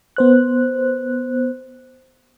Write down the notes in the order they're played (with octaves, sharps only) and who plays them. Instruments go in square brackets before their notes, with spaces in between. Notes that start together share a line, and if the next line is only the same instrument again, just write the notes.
[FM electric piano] B3 C5 F#6